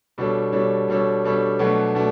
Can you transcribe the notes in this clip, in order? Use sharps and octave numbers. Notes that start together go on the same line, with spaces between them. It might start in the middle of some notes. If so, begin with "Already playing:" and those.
B2 G3 D4 A4 C#5
B2 G3 D4 A4 C#5
B2 G3 D4 A4 C#5
B2 G3 D4 A4 C#5
B2 F#3 A3 D4
B2 A3 D4